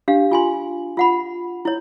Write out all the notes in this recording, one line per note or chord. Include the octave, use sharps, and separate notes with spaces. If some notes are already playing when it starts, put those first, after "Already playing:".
D4 G4 F5
F4 G#5 C6
F4 F#5 B5
E4 C#5